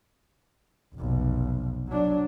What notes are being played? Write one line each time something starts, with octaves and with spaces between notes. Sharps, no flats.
F1 B1
F#3 D4